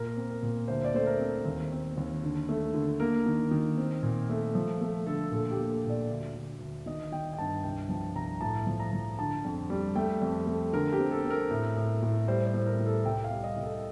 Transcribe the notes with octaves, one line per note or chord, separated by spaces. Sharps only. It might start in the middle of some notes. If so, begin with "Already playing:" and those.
Already playing: A#2 A#4
C4
A#4
A#2
D2 C5
D5
A3 C5
A#4
C4
D#2
C4
D#2
D3
A3
D3
A#3 A#4
D#3
D#3
C4
A#2
A3
F3
A3
D3 A4
A#2 A4
G4
A#3
A4
A#2
D5
D2
D2
D2
D#3 D#5
D#3 G5
G5
G2 A5
C2 G5
F3 A5
C2 A#5
A2 A5
F3
A#5
F3
D3 A5
F2
G3
A3 G5
F2
A3
D3 A#4
G4
C4
A4
C4
A#4
A2
A2
A2
G3 C5
C5
A2
A#4
A2
A4
C2 G5
F5
G3
D#5
C2
A4